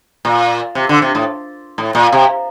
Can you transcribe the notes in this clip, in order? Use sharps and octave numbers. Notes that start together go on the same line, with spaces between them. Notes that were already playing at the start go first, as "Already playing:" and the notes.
A#2
C3
D3
C3
A2
A2
A#2
C3